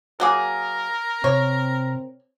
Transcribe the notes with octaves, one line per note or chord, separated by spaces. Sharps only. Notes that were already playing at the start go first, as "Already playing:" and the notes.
F#3 A#3 G#4 A#4
C3 C4 C#5